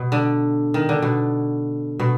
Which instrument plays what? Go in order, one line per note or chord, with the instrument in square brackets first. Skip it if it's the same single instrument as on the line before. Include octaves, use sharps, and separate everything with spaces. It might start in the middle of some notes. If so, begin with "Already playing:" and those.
Already playing: [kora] B2
D3
D#3
D3
B2
B2